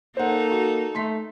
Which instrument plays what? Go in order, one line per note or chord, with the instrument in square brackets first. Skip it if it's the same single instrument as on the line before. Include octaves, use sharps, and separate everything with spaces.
[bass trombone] A#3 [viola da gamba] D#4 A4 [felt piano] C5 F#5
[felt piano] F#4
[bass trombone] A3 [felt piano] C6 B6